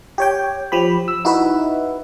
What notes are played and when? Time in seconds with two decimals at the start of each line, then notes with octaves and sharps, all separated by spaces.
0.18 G4 C#5 G5
0.72 F3 G4 B5
1.08 E6
1.25 D#4 E4 F#4 B4 E5